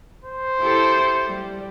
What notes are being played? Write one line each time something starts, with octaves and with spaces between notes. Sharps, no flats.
C5
E4 G4 A4
G3